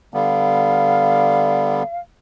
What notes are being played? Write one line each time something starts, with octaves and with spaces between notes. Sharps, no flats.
D3 G3 B3 F5